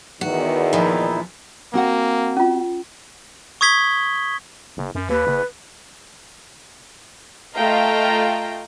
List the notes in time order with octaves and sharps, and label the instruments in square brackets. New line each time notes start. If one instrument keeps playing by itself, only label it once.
[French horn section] E2 D#3 [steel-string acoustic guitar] F#4
[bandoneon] A#2 D#4 E4 [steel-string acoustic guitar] E3 F3
[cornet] A#3 [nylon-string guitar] C4 F#4 F#5
[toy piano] C#4 F4
[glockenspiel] C#6 D#6 G#6 B6 G7
[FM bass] F#1
F#2
[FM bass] D#2 [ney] B4
[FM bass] F#1
[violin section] A3 F4 D#5 F5 G5 A#5